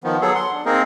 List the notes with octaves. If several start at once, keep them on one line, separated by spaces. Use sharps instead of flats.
D#3 F3 B3
F#3 B3 G#4 A4
F#5 C6
D4
A#3 C4 D#4 G#4 A#4